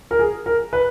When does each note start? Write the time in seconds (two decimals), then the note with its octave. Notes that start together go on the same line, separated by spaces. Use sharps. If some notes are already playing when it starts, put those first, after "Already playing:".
0.11 A#4
0.19 G#4
0.46 A#4
0.73 B4